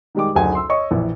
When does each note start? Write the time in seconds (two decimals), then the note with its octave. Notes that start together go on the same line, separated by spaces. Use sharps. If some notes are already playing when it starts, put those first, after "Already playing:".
0.15 D#3 G3 G#3 G4 D6
0.35 F#1 D2 D#4 G#4 G#5
0.55 C6 E6
0.69 C#5 D#5 C#6
0.91 A#1 E3